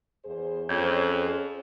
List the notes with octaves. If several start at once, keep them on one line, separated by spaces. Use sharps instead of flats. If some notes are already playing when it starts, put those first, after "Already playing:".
E2 G#4 C5
F2 C#4 F4 G#4 C5 C#5